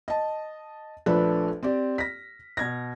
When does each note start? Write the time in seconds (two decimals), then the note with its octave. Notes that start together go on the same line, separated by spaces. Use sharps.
0.08 D#5 A5
1.06 A#1 F3 A3 D4 A4 B4
1.63 C4 G4 D5
1.98 A#6 B6
2.57 B2 G#6 A#6